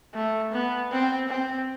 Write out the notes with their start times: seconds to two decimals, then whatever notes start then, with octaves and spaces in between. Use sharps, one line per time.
0.14 A3
0.52 B3
0.91 C4
1.29 C4